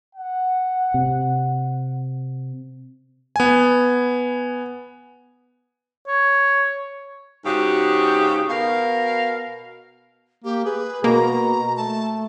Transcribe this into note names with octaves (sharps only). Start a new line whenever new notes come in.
F#5
C3
B3 G#5
C#5
G#2 C#3 F#4 G4
B2 A#4 F5
A#3 G4
G#4 B4
B2 A#3 A#5
A3 A5